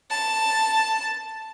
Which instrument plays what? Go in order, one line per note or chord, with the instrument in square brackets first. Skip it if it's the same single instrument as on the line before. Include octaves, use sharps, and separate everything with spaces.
[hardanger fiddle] A5